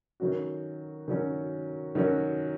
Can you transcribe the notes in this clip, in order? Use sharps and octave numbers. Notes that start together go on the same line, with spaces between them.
D#3 F#3 C#4 F#4
D#3 F#3 C#4 F#4
D#3 F#3 C#4 F#4